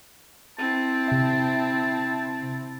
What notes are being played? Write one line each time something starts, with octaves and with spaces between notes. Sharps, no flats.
C4 E4 A5
C3 E5